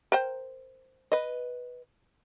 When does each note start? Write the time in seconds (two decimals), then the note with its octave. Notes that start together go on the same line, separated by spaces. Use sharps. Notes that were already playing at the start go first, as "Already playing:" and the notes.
0.12 A#4 C5 G5
1.12 B4 D#5